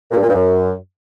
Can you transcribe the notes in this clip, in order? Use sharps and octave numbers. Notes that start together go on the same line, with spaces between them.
A#2
G2
A#2
G2
F#2